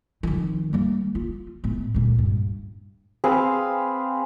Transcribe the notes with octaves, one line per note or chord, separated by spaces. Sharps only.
F2 D#3
G3 A#3
F4
A2 B3
C#2 A#2
G2
C4 G#4 B4 F5